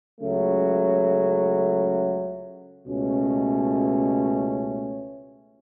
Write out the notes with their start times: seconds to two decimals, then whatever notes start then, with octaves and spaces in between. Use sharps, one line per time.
0.20 C#2 C#3 F#3 A3
2.86 C#2 B2 A3 C#4